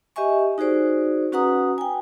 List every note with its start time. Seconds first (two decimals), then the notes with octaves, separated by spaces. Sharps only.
0.16 G4 D#5 E5 G#5 C#6
0.58 D#4 F#4 G#4 C5 D5
1.32 C#4 F#4 B4 F#5 A#5 D#6
1.78 G5 G#5